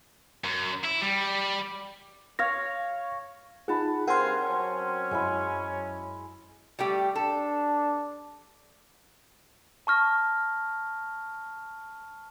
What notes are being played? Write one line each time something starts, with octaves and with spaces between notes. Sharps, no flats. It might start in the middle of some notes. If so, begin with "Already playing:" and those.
F#2
E4
G3
C#5 F5 A#6
D#4 F4 G#4 F#5 A5 B5
G2 C4 G#4 A#4 F5 F#5 C6
F#3 C#4
F#2 G#3 E4 B5
G3 A3 G4
D4 A4
A5 C#6 F6 A#6